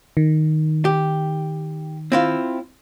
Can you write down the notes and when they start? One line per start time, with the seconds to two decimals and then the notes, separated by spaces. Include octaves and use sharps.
0.17 D#3
0.85 G4
2.12 C4 E4 F4